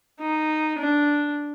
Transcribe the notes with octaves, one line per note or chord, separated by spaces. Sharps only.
D#4
D4